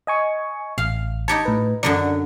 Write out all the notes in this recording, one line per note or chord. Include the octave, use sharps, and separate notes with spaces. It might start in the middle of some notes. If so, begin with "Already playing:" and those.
D#5 G#5 C#6
A1 F5
D#4 G4 C#5 A5
A2 B4
F#2 D3 F#3 D5